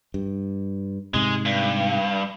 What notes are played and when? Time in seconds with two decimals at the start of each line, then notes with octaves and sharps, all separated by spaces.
0.14 G2
1.14 G#2 C3 G#3
1.45 G2